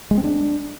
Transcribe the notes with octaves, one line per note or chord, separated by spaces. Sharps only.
G#3
C4
D4